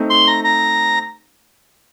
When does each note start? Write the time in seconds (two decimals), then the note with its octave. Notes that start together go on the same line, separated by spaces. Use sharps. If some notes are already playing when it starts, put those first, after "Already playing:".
Already playing: A3 C4 D#4
0.10 C6
0.27 A#5
0.44 A#5